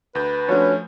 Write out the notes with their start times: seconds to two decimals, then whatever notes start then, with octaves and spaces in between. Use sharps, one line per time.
0.15 D2 B4 G6
0.49 F3 A3 C#4 D4 F#4 C#5